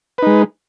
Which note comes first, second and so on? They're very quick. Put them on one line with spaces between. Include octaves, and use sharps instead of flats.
B4 D#4 G#3